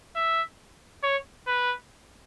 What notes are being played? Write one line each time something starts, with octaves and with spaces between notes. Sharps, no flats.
E5
C#5
B4